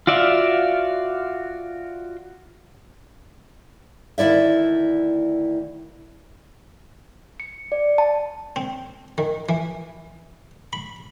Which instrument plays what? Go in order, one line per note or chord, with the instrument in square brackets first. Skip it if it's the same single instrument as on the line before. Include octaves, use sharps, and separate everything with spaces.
[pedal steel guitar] F4 F#4 D5 E5 F5
[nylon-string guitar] D2 D#3 E4 D5 E5
[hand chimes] C#7
D5
A5
[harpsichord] C4
D#3
E3
B5